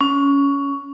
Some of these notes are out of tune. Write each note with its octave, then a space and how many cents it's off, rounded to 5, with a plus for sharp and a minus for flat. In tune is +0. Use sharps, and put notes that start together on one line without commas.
C#4 +15